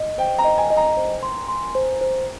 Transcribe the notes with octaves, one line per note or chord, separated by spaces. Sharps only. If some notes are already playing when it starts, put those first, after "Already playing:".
Already playing: D#5
C5 G5
A#5
D#5
G#5
D#5
A#5
C5
C6
C6
C5
C5